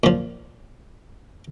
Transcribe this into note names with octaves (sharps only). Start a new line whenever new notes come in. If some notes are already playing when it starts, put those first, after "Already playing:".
A#2 F3